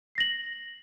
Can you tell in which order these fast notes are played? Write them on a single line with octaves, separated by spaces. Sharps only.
C7 A#6 F#7